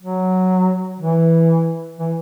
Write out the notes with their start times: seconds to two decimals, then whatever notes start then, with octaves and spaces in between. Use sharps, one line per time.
0.01 F#3
1.00 E3
1.99 E3